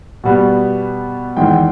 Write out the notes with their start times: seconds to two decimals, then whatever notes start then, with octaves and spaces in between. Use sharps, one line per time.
0.24 B2 G3 B3
1.37 E2 D#3 G#3 G5